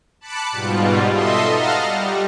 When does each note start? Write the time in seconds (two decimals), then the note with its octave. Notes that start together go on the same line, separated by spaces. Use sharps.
0.21 A5 B5 D6 F#6 C#7
0.52 G#2 B2 G3 F4
1.09 A4 D#5 E5 C6
1.52 D#5 F5 F#5 A5 A#5 F6
1.84 G3